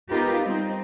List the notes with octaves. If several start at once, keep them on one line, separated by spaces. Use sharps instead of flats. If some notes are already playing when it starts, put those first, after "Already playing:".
B3 D#4 F4 G4 A#4 B4
G3 C4 D#4